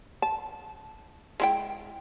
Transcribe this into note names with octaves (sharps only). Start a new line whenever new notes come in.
A5
G#3 E4 G5